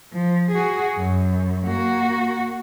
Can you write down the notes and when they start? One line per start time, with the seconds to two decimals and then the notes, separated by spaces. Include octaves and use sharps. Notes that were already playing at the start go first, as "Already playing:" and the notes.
0.13 F3
0.51 F#4 G#4
0.97 F#2
1.67 A#3 F#4